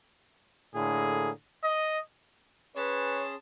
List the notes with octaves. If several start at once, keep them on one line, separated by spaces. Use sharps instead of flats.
A2 D3 A#3 G#4
D#5
C#4 G#4 B4 C#5 A5 C6